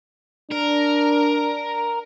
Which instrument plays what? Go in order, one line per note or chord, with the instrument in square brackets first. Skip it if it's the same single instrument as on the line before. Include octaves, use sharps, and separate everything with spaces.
[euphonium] D4 [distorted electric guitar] A#4